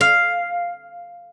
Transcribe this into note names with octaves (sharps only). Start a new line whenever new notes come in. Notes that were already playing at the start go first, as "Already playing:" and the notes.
F5